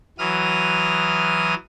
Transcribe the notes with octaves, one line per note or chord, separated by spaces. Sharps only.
E3 F#3 D#6 F6